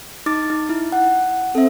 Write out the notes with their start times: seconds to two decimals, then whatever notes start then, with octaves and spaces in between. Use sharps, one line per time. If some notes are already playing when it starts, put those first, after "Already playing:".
0.26 D#4 D6 A6
0.50 D#4
0.69 E4
0.92 F#5
1.55 C4 A4 E5